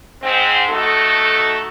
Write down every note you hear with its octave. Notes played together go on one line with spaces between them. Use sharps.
G#2 C4
A3 D#4 F#4 A4